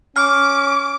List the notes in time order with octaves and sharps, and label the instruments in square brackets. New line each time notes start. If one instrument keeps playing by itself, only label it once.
[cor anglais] C#4 [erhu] D6 [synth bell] F6